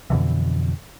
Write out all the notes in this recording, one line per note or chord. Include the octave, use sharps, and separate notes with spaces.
F2 B2 D3 E3